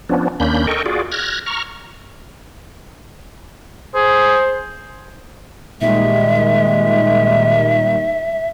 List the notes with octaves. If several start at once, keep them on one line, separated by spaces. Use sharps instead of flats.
F3 B3 C#4 D4
D#2 A#3 C#4 D4 B5 G6
A4 A#4 D#5 G5 C#6
F4 F#4 G#4 D5
F6 F#6 G#6 A#6
A#5 C#6 F6
G#4 C5
A#2 D#3 G3 G#3 E5